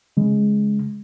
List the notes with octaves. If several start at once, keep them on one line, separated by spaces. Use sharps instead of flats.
C#3 G#3